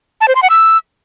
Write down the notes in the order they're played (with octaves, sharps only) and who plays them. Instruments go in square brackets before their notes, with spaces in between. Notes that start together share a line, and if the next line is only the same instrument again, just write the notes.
[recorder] A5
C5
C6
F#5
E6